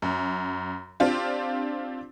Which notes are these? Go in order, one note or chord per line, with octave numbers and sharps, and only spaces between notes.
F#2
C4 D4 F4 G4